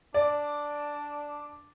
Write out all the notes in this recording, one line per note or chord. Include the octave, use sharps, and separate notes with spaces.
D4 D5